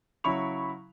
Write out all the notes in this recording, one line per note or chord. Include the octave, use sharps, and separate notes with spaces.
C#3 F#3 E4 B5 C#6 F7